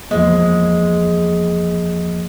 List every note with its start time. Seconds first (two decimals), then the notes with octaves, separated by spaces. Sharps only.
0.11 E2 F3 G#3 A#3